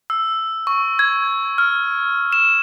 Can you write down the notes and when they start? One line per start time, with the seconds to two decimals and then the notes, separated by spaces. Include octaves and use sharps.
0.10 E6
0.67 C#6
0.99 G#6
1.58 F6
2.32 E7